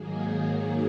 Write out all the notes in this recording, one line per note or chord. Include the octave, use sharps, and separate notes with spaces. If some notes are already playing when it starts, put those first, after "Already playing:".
Already playing: G#2 D#3 F#3 A#3 G#4